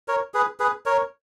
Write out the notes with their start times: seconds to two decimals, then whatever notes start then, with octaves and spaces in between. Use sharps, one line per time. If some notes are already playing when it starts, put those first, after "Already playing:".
0.08 A#4 C#5
0.34 G#4 B4
0.60 G#4 B4
0.86 A#4 C#5